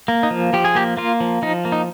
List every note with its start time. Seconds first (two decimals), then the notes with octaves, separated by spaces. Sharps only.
0.08 A#3
0.23 D#4
0.31 F3
0.53 F3 G4
0.65 G#4
0.75 A#3 G4
0.97 A#3 F4
1.20 F3
1.42 F3 D#4
1.65 A#3
1.72 D#4